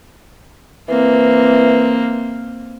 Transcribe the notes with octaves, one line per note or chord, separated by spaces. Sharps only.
E3 A#3 C4